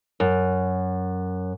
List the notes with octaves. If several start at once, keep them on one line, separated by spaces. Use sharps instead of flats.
F#2